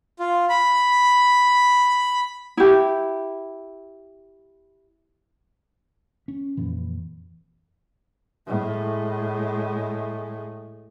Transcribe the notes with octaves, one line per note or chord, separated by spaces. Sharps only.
F4
B5
E4 G4
C#4
F2 A#2 E3
A2 G#3